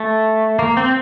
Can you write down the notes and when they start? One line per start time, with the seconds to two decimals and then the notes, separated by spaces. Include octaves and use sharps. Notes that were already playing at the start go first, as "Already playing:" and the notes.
Already playing: A3
0.59 A#3
0.77 C4